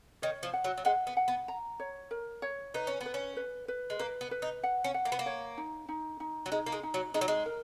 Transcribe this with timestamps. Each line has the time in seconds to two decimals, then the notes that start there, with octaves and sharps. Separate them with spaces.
0.22 D#3 C#5
0.43 F3
0.53 F#5
0.64 F#3
0.78 F#3
0.85 G#3 F#5
1.07 B3
1.17 F#5
1.28 B3
1.48 A#5
1.80 C#5
2.11 A#4
2.42 C#5
2.74 D#4 B4
2.87 C#4
3.01 B3
3.06 B4
3.14 C#4
3.37 B4
3.68 B4
3.90 G#3
3.99 A#3 B4
4.21 B3
4.31 B4
4.42 D#4
4.63 F#5
4.84 C#4
4.94 F#5
5.05 A#3
5.12 B3
5.19 A#3
5.26 C#5
5.57 D#4
5.89 D#4
6.20 D#4
6.46 F#3
6.51 G#3 D#4
6.66 A#3
6.72 G#3
6.83 D#4
6.94 F#3
7.14 G#3 D#4
7.21 F#3
7.28 G#3
7.46 A#4